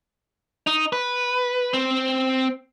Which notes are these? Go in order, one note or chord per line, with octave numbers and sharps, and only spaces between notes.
D#4
B4
C4